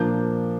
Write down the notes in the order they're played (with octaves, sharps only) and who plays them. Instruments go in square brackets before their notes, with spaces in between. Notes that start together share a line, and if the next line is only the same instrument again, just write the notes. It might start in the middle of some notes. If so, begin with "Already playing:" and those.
Already playing: [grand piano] A#2 F3 A#3 D4 G6